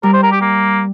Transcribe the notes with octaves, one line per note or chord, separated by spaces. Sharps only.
G3 A#4
C5
A#4
G4
A#3